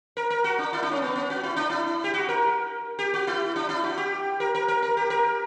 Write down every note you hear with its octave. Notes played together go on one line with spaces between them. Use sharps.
A#4
A#4
F#4
D4
E4
D4
C#4
B3
C#4
F#4
E4
D4
E4
G4
F#4
A#4
G4
F#4
E4
D4
E4
F#4
G4
A#4
A#4
A#4
A#4
G4
A#4